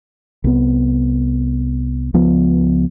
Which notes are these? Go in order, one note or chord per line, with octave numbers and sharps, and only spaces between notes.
C2 B3
C#2 F3 B3